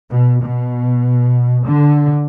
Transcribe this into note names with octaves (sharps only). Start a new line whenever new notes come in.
B2
B2
D3